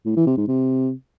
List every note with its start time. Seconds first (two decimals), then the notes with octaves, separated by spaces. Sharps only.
0.06 A2
0.16 E3
0.27 C3
0.37 G#2
0.48 C3